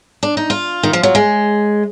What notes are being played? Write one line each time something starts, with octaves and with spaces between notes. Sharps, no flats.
D4
D#4
F4
D#3
F3
F#3
G#3